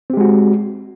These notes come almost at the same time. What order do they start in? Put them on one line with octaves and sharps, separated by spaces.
C4 G4 G#3 F#4